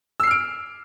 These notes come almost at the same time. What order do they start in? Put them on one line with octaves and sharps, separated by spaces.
E6 C7 F6 D7